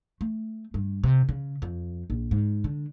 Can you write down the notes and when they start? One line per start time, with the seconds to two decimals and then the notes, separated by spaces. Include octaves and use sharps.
0.21 A3
0.74 G2
1.04 C3
1.29 C#3
1.62 F2
2.10 A#1
2.31 G#2
2.64 D3